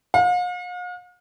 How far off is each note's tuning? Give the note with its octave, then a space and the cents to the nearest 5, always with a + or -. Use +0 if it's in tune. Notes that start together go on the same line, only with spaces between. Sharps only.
F5 +45